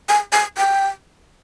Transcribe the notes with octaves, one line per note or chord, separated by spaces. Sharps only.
G#5
G#5
G5